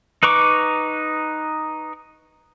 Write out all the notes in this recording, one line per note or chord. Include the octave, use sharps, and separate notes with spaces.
D#4 B4 A#5 C#6 D6